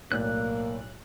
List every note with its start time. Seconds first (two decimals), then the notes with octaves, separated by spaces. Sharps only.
0.12 B1 A2 A#3 D5 F#6